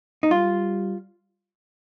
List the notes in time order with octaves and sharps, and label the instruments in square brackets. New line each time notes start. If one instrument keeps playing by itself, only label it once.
[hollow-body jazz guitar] D#4
[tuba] G3 [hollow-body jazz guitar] F4